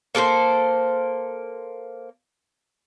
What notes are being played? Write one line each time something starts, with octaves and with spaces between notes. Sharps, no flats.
A#3 A4 A#4 C5